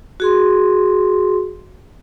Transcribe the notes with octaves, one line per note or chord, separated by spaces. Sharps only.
F#4 G#4 C6